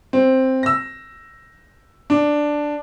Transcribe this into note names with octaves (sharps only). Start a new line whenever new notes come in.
C4
E6 A#6
D4